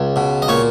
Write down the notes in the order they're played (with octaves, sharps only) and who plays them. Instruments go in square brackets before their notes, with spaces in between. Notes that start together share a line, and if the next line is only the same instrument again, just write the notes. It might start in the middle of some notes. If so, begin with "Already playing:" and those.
Already playing: [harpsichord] C#2
B2
D#5
A#2 C#5